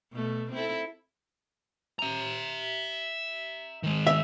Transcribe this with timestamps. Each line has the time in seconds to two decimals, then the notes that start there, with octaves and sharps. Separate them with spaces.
0.12 B2 A3
0.52 C4 E4 A4
1.99 E5 A#5
3.83 D#3 G#3
4.07 E5